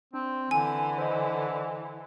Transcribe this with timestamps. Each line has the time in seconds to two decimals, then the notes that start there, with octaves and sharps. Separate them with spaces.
0.14 C4 D4
0.51 D3 E3 G#5
0.98 C5 D#5